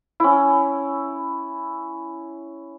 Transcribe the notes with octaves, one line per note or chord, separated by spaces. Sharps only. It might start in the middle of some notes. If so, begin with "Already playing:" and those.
C#4 E4